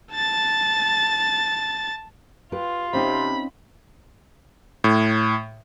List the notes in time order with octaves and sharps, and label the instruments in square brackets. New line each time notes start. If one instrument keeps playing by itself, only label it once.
[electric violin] A5 A6
[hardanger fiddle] F4 [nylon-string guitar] G4 B4
[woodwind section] C3 [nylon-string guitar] C4 C#4 D#4 [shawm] B5
[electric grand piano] A2